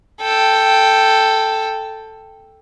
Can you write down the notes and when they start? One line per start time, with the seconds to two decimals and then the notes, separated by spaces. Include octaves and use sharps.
0.21 A4 G5